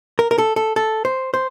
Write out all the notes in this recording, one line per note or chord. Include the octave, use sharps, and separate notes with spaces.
A#4
A#4
A4
A4
A4
C5
C5